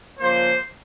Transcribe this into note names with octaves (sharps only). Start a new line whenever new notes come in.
C#3 F3 A#3 C5